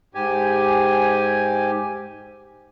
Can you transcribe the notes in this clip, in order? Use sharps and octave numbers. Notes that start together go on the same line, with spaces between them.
G#2 G4 G#5